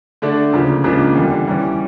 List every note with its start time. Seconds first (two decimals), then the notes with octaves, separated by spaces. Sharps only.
0.22 D3 A3 D4 A4 D5
0.53 D2 C#3 F3 A#3
0.84 C#2 C#3 F3 A#3 D4
1.15 E2 D3 G3
1.47 E3 G3 C#4